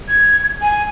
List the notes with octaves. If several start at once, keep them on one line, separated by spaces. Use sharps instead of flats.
G#6
G#5